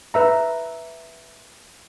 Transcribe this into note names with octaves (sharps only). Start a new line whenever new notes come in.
B4 E5 A#5